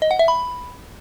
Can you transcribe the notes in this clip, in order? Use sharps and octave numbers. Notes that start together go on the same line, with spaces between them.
D#5
F#5
E5
B5